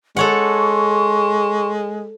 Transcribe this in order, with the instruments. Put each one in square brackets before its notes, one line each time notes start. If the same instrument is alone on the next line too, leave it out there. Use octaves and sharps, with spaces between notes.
[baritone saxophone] G#3 [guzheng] A4 C#5 F#5 [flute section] C6 C#6